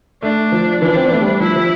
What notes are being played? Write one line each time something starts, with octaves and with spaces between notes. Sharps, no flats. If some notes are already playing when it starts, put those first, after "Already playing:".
A3 D4
F3
E3 D4
C4
B3
A3
G3
F3 E4
F3